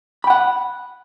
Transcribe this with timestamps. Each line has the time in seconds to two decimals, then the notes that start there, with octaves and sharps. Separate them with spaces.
0.24 B5
0.27 G5
0.30 F#5